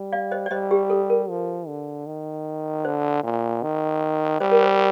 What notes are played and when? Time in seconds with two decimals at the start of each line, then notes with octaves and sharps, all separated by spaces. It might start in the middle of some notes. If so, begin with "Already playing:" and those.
Already playing: G3
0.12 D5 F5
0.31 C5 D#5
0.46 D5
0.51 G3 C5 D#5
0.71 G4
0.90 A4
1.10 A#4
1.29 F3
1.67 D3
2.06 D#3
2.85 D3 C5
3.23 A#2
3.63 D#3
4.40 G3 C5
4.52 A#4
4.62 C5